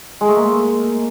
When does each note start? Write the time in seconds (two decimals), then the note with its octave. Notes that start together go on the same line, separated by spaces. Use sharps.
0.21 G#3
0.29 A3
0.36 A#3